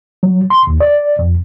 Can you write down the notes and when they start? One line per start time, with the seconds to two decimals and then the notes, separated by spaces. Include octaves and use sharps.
0.23 F#3
0.50 C6
0.67 D#2
0.80 D5
1.19 F2